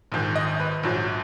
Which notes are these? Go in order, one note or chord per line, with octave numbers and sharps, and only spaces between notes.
A#1 G#2 D#3
D#5
B4
A#1 G#2 F#3